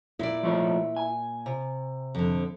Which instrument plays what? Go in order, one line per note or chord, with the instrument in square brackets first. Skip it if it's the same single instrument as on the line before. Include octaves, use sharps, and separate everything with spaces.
[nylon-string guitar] A#2 D5 [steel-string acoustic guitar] E4 E5
[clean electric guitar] F3 A3 C#5
G#5
[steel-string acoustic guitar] C3
[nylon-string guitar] F2 D3